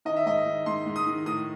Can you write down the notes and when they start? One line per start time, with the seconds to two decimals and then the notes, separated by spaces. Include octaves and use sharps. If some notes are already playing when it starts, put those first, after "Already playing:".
0.05 D#3 D#5
0.16 E5
0.26 G#2 D#5
0.46 D#3
0.66 G#2 C6
0.86 G#2
0.96 D#6
1.07 D#3
1.26 A2 D#6